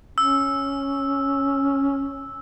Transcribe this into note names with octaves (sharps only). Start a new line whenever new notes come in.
C#4 E6